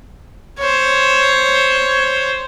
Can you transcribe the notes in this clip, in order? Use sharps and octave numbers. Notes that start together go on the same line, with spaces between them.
C5 C#5